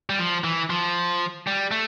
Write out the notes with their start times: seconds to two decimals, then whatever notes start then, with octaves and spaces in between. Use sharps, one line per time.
0.10 G3
0.19 F3
0.44 E3
0.70 F3
1.47 G3
1.71 A3